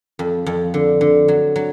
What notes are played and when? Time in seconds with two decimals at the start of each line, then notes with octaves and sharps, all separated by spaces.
0.19 F2
0.46 F2
0.74 D3
1.01 D3
1.28 F#3
1.56 F#3